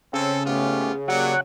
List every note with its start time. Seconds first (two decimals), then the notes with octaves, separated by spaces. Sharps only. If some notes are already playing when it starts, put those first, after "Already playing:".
0.13 C#3 C4 C#4 A4
0.46 G#2 A3 B3 C#4 F4 G4
1.08 F#3 A#3 G4 D5 F#5